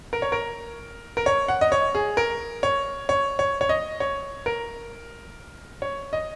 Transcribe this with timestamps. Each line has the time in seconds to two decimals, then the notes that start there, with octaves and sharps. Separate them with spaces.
0.13 A#4
0.22 C#5
0.32 A#4
1.17 A#4
1.26 C#5
1.48 F#5
1.61 D#5
1.72 C#5
1.95 G#4
2.17 A#4
2.63 C#5
3.09 C#5
3.39 C#5
3.61 C#5
3.69 D#5
4.00 C#5
4.46 A#4
5.82 C#5
6.13 D#5